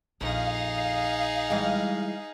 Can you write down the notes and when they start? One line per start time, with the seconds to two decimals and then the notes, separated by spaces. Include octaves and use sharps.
0.21 A#1 F2 D#4 G#4 F5
1.50 E3 G3 G#3